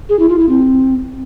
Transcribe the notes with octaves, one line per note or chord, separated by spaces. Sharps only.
G#4
E4
F4
E4
C4